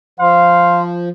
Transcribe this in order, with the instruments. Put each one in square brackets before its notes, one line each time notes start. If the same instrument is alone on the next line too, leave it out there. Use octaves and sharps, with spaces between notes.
[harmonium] F3 [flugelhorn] F5 [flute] C6